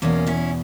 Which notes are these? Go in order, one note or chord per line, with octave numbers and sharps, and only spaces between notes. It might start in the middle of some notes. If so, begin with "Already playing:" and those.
E2 B2 A#3 C#4
C#4 E4